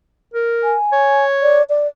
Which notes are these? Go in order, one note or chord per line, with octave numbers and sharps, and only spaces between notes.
A#4
G#5
C#5
D5
D5